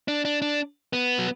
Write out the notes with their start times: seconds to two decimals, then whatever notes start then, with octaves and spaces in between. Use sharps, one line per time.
0.08 D4
0.25 D4
0.42 D4
0.93 B3
1.19 F#3